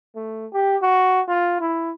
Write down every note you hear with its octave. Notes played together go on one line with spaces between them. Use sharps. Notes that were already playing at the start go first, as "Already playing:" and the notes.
A3
G4
F#4
F4
E4